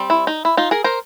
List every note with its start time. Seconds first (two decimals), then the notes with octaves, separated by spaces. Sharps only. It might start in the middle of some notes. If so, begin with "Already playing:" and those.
Already playing: G3 C4
0.10 E4
0.27 D#4
0.45 E4
0.57 D#4 F4
0.71 G#4 A#4
0.84 A#4 C5